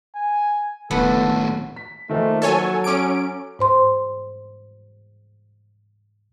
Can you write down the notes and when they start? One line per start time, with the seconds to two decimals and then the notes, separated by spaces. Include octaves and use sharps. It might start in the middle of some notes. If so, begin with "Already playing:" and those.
0.15 G#5
0.91 E1 D#2 A2 B3 A4
1.76 B6
2.09 D#3 F3 A3 A#3
2.42 F#3 A4 C#5 G#5
2.84 C#4 A4 D6 D7
3.59 G#2 C5 C6